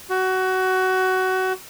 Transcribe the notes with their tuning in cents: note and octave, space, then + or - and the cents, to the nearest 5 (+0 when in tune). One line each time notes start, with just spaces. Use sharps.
F#4 +20